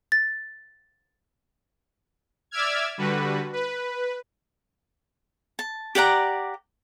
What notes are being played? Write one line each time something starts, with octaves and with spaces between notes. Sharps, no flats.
A6
D5 E5 D6 E6 F6 G#6
D3 G3 F#4 B4
B4
A5
G4 D5 F#5 A#5